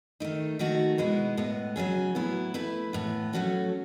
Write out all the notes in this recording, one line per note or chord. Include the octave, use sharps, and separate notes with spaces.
D#3 A3 D#4
D#3 A3 D#4 F#4
B2 G#3 B3 E4
A2 G#3 B3
C#3 F#3 C#4 G#4
A2 F#3 B3 E4
A3 E4 B4
A2 E3 B3
F#3 A3 C#4 F#4 A4